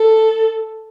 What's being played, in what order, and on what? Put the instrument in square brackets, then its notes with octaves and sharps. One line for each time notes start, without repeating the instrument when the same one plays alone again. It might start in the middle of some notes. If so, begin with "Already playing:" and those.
Already playing: [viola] A4